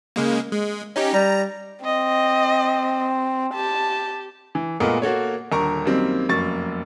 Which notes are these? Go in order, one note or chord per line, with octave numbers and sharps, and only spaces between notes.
C#3 G#3 A#3
G#3
C#4 D#4 G4
G3 A#5
C4 D#5
G4 A5
E3
A#2 G#3 A3 B3 F4 A#4
A#3 F#4 A4 C#5
D#1 D3 A#4 A#5 C#6
F#2 D#3 G3 A#3 C4
F1 F#2 A#3 C#6 A6